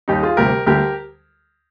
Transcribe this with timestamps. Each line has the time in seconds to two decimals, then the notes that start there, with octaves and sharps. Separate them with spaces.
0.08 D#2 D#3 G3 D#4 G4
0.22 F4 G#4
0.37 D2 C3 G3 G4 A#4
0.66 D2 D3 G3 G4 A#4